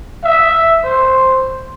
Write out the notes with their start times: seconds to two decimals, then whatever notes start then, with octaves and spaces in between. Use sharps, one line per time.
0.24 E5
0.84 C5